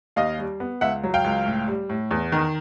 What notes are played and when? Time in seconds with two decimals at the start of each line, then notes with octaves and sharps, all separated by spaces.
0.16 D#2 D#5 F5
0.39 G3
0.60 B3
0.81 C#2 E5 F#5
1.03 F#3
1.14 F5 G5
1.24 C#2
1.46 A2
1.68 G3
1.89 A2
2.11 E2
2.32 D#3